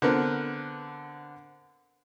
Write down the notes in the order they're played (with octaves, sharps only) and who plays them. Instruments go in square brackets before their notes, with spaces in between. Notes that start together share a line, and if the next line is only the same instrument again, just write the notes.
[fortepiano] D3 B3 C4 A#4 B4